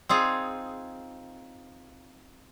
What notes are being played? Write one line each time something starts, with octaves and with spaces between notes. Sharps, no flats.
C4 D#4 F4 G#4